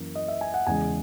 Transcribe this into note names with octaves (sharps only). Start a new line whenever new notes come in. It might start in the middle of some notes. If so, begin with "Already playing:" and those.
Already playing: F#2 E3 A#3
D#5
E5
G#5
F#5
E2 C#3 G#3 G#5